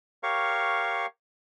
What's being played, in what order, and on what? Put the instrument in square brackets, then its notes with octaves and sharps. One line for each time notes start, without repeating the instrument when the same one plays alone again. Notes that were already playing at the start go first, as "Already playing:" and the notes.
[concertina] G4 A#4 C#5 F5 C#6